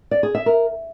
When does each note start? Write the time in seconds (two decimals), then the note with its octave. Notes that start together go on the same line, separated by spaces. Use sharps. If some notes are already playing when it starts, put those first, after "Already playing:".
0.11 D5
0.23 G#4
0.35 E5
0.46 A#4